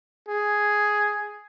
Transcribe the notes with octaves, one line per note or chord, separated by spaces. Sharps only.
G#4